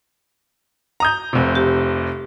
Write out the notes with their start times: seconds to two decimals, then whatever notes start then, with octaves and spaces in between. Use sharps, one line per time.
1.00 A#5 D#6 G6
1.33 F1 C3
1.55 G4